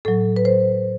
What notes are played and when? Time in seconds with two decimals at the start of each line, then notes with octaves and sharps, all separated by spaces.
0.05 A2 F#3 A4
0.36 B4
0.45 C5